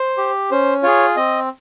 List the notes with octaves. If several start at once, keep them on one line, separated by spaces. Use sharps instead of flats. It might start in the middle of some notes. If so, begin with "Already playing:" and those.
Already playing: C5
G4
C#4 C5
F4 G#4 C#5
C4 D#5